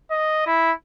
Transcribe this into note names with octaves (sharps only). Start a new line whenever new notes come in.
D#5
E4